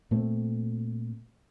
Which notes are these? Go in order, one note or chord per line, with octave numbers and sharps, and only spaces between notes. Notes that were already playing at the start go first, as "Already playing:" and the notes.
A#2 A3 C4